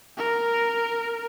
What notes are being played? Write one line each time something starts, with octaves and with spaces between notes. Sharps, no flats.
A#4